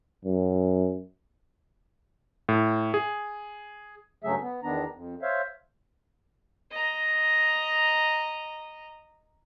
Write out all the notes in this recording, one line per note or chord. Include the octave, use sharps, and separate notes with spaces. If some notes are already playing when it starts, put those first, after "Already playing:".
F#2
A2
G#4
G2 C#3 F#3 A3 G#4 E5
B3
E2 D#3 B3 D4 A#5
F2
C5 C#5 E5 F5
D#5 A#5